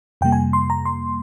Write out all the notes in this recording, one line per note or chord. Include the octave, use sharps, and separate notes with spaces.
F2 C3 G3 A#3 G5
G#5
C6
A#5
C6